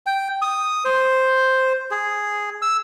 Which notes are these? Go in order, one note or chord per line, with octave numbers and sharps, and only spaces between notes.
G5
D#6
C5
G#4
E6